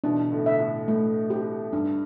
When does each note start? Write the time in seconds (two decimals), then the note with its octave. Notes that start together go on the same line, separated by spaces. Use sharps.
0.04 B2 E3 D4
0.32 A2 D3
0.46 E5
0.60 A2
0.88 A2 A3
1.30 G4
1.72 G2 D4